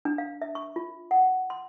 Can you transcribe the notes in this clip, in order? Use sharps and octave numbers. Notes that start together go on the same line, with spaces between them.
D4
F5
E5
C#6
F4
F#5
C6